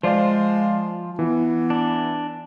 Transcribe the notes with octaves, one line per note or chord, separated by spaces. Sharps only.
F3 G#3 F4 C5 D5 F5
E3 B3
D4